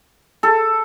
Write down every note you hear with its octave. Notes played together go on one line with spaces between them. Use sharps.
A4